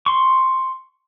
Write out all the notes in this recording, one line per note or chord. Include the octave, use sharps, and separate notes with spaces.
C6 C#6